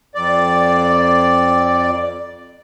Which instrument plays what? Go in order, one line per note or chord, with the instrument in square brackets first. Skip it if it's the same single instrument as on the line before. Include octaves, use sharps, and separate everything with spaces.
[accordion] F2 D5